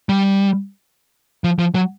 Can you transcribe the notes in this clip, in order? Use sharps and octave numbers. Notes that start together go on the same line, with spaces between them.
G3
F3
F3
F#3